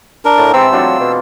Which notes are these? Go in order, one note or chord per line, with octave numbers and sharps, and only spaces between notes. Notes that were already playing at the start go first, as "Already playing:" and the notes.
D4 A#4
A2 A5 A#5
G#2 C3 E3 C4 E6
F#3 A3 D4 F4
B2